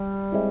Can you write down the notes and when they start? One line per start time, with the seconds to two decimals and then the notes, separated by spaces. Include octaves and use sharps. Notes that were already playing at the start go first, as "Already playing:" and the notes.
Already playing: G3
0.32 G#3 C4 E4